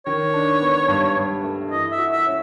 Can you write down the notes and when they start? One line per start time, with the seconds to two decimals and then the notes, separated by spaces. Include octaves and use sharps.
0.06 D#3 C#5
0.34 D4
0.61 B3
0.88 G2
1.17 G2
1.44 A3
1.71 E3 D#5
1.91 E5
1.98 F#4
2.12 E5
2.26 C#4